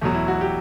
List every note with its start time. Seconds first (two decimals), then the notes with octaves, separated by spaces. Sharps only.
0.01 E2 B2 F#3 A3
0.14 E4
0.28 F#4
0.41 G4